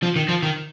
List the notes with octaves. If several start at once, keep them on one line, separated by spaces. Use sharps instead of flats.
F3
D#3
F3
D#3